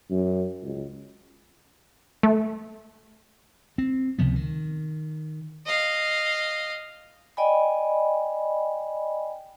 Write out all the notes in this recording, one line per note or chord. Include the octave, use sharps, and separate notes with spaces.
F#2
C#2
A3
C4
C#2 C3 F3 B3
D#3
D#5 F5
D5 D#5 G5 G#5 B5